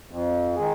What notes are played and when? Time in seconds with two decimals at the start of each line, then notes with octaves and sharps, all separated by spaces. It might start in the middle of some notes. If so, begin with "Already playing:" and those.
0.11 F2
0.55 D#3 G#3